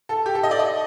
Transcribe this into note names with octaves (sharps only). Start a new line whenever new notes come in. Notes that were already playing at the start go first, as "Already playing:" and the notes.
A4
G4
A4
D#5
D5
D#5